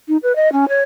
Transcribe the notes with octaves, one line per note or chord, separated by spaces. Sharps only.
D#4
B4
D#5
C#4
C#5